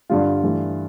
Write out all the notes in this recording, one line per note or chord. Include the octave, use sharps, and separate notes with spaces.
G2 D3 G3 F4
G2 E3 A3